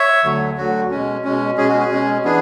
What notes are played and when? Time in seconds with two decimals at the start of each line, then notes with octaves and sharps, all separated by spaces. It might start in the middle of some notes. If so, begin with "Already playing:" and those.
Already playing: C#5 E5
0.24 D2 D3 F#3
0.57 D2 D3 F#3 F#4
0.91 B2 G#3 C#4
1.24 B2 G#3 C#4
1.57 B2 G#3 C#4 G#4
1.68 F#4
1.78 G#4
1.92 B2 G#3 C#4
2.24 E3 B3 D4 G#4